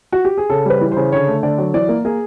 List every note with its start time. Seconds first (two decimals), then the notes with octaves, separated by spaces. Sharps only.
0.12 F#4
0.25 G4
0.38 G#4
0.50 C#3 A4
0.66 G3 B4
0.81 E3
0.92 C#3 C5
1.12 D3 C#5
1.28 A3
1.43 D3 D5
1.58 F#3
1.74 E3 D5
1.89 A#3
2.05 A#3 G#4